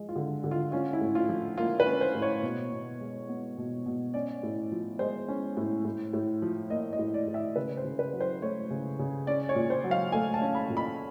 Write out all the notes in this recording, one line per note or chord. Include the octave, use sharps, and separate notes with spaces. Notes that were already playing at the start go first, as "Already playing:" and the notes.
Already playing: F3 G#3
F4
D3
D3
F4
C#4 F4
E4
A2
F4
F3
A#3 F4
B4
C#4
C5
A2
C#5
B2
B2
G#3
B3
B2
B2
C#4 D5
A2
F3
G#3 C5
C#4
A2
A2
A2
F3
A#3 D#5
D#5
A2
D5
A2
E5
C#3 B4
C5
C#3
B4
F#3
C5
A3 C#5
C#3
C#3
C#4 D5
C#5
A#2
C5
F#3
F5
A3 G#5
A5
C#4
B5
A#2
B5